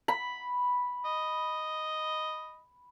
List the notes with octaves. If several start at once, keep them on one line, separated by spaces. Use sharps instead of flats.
B5
D#5